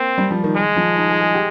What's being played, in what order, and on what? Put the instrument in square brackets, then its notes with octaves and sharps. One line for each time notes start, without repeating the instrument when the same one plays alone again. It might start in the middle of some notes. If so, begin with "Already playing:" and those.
Already playing: [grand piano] A#3 [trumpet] C4
[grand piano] G3
F3
D#3
[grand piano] D#3 [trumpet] G#3
[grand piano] F3
D#4
G#4
G#4
G4